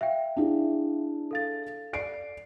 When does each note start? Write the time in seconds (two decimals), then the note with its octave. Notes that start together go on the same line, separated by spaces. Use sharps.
0.01 E5 F5 G5
0.36 D4 E4 G#4
1.31 A4 F5 A6
1.93 D5 C7 D7